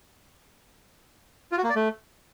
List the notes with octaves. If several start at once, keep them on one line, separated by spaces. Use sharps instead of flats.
F4
F#4
A#3
D5
A3